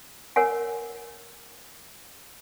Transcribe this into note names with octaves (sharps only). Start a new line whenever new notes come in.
A#4 C#5 F#5 G#5